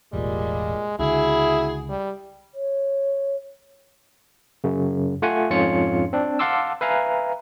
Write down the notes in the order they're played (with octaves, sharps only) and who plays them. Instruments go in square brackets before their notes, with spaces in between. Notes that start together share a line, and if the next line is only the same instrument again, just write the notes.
[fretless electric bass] E1 A1 [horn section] A#2 G3 [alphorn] G#3
[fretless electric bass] C#2 D3 [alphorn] E4 [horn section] F#4 G#4
[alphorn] G3
[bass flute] C#5
[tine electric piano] F#2 C#3
A3 F4 F#5 G#5
F2 G#2 C#4 F4 C#5 C#7
C4 D4
F5 F#5 A5 C6 D6 E6
B4 E5 F5 G#5 A#5